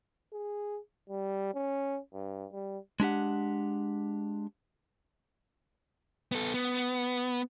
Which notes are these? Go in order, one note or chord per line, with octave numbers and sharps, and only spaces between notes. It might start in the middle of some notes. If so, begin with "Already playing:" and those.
G#4
G3
C#4
G2
G3
G#3 D4 G4 F#5
B3 A4
B3